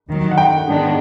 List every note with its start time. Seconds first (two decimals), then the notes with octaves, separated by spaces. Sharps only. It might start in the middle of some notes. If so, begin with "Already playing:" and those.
0.08 D#2 D#3 F#3
0.31 F#5
0.38 G5
0.67 G#2 D#3 G#3 B3 D4